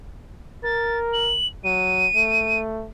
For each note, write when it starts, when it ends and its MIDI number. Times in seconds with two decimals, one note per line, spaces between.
0.64 1.38 70
0.64 0.98 93
1.13 1.47 102
1.64 2.08 54
1.64 2.60 99
2.15 2.88 57